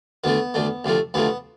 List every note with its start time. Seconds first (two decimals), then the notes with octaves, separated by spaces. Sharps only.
0.24 D2 D3 A3 B3
0.54 D2 D3 A3
0.84 D2 C3 F3 A3
1.14 D2 C3 F3 A3 B3